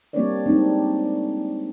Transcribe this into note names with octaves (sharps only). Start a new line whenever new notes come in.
G3 A#3 C4 D4 C#5 D5
G3 G#3 A#3 C4 D4 D#4